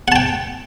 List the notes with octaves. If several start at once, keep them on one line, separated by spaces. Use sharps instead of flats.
F#5 G5 A5